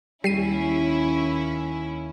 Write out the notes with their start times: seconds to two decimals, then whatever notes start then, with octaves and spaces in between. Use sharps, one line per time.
0.24 D#2 G3 C#4 E4 C7 D#7